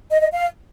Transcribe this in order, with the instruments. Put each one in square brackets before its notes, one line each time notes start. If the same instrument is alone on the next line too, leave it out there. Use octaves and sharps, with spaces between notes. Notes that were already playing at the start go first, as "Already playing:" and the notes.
[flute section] D#5
D#5
F5